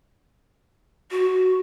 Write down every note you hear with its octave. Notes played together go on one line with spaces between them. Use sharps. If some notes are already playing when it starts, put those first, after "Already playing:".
F#4